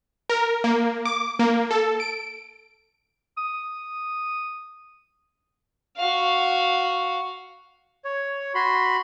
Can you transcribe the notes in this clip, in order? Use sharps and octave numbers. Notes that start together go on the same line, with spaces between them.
A#4
A#3
D6
A#3
A4
D7
D#6
F#4 F5
C#5
F#4 B5 C6